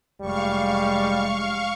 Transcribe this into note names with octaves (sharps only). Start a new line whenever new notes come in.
F1 G3 G#3 F5 C#6